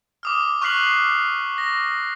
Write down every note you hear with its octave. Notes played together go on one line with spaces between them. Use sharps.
D6 D#6 F6
C#6 F6 F#6 B6 C7 F#7
A#6